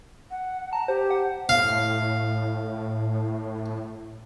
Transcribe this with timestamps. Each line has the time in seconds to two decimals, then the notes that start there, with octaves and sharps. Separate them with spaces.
0.31 F#5
0.73 A5 A#5
0.88 G4 C5
1.10 F#5
1.49 A2 F5